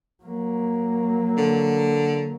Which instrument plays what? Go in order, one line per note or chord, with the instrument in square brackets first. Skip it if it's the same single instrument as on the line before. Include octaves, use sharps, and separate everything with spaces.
[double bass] F#3 A#3
[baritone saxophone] D3